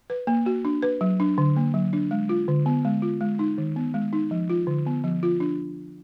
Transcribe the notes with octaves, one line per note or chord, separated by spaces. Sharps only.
B4
A#3
F#4
D4
B4
F#3
D4
D3
A#3
F#3
D4
G#3
F4
D3
B3
G#3
F4
G#3
D#4
D#3
B3
G#3
D#4
F3
F4
D3
B3
F3
F4
D4